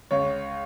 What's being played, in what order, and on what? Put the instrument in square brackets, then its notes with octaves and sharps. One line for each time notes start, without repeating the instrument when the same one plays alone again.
[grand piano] C#2 C#5